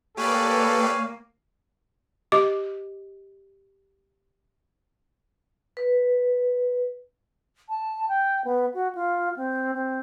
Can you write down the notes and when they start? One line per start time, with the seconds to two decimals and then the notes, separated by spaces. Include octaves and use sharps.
0.17 A#3 G4 A4 B4 C#5 D5 F5 G#5
2.32 G4 D#5 D6
5.77 B4
7.69 A5
8.09 G5
8.45 B3
8.74 F#4
8.95 F4
9.37 C4
9.74 C4